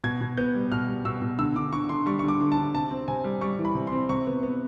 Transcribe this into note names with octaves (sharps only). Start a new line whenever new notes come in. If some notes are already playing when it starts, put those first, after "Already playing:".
B2 G#6
B2
B3 G6
G3
B2 F6
G3
B2 E6
B2
D3 E6
D3 D6
D3 C#6
D3 C6
G3 C#6
D3 C#6
D6
D3
A5
D3
C3 A5
C4
C3 G#5
G3
G3 C#6
E3
B5
C3
C6
C4
C3 C#6
B3
B3